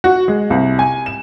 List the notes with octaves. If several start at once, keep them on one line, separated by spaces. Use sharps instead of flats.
F#4
G#3
C2
G#5
E7